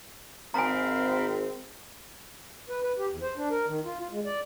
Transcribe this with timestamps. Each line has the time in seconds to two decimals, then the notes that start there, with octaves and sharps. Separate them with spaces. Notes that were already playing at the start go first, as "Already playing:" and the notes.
0.54 G#1 C4 A#4 F5 G#5 A#5 B5
2.69 B4
2.83 B4
2.98 G4
3.09 E2
3.22 C5
3.37 D4
3.51 A#4
3.67 D#3
3.85 F4
3.99 F4
4.11 G#3
4.26 D5